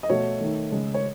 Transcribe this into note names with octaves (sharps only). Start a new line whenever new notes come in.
D#5
B2 A3 C#5
D#3 A3
C#3 G#3
C#5